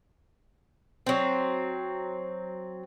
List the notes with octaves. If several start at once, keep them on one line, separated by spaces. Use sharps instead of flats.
F#3 C4